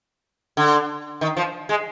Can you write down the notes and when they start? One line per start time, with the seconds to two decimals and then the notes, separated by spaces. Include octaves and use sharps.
0.57 D3
1.21 D#3
1.37 F3
1.69 G#3